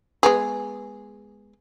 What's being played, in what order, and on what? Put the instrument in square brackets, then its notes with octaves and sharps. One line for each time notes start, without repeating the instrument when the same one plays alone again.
[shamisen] G#3 B3 G#4